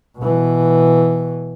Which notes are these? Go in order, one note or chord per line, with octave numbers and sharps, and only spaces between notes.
B2 E3